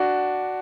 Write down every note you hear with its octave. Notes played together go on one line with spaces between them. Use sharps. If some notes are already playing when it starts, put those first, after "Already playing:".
Already playing: D4 F#4